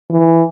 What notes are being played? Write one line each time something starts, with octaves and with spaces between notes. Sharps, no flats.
E3